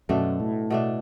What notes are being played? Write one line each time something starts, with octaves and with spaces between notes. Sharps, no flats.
F#2 B2 A3 D4
A2
B2 A3 D4